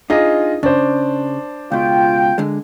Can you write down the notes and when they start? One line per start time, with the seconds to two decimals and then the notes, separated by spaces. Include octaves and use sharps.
0.10 D4 D#4 F4 G#4 D#5
0.63 C#3 D4 C5
1.72 C#2 B2 F4 G5
2.38 D3 G#3